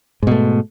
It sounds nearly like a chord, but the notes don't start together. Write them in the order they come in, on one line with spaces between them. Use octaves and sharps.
G#2 B2 A3